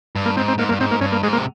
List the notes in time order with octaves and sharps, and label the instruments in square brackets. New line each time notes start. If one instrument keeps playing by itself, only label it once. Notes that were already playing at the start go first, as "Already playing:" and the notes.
[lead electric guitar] G2
[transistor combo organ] A#3
[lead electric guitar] G#2 [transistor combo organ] C4
[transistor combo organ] C4
[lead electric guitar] G#2 [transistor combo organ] A#3
[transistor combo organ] A#3
[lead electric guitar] G2
[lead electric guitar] G#2 [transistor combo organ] C4
[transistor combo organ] A#3
[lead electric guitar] G2 [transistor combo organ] C#4
[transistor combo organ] A#3
[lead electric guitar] G#2 [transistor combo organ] G#3
[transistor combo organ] A#3
[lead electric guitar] C3